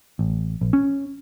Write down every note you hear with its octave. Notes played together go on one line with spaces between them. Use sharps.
A1
A#1
C#4